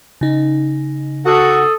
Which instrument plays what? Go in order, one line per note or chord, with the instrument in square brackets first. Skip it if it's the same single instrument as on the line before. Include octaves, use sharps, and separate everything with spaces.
[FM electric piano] C#3 D#4
[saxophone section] F#4 [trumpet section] A4 D#6